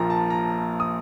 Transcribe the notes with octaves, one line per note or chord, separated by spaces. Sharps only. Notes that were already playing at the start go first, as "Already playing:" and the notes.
Already playing: A#1 A#2 F3 A#5
A5
A#5
D#6